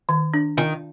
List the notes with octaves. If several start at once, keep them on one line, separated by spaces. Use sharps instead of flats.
D#3
D4
D#3 F4